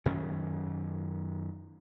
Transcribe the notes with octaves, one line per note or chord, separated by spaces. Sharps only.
F#2 D#3 C#4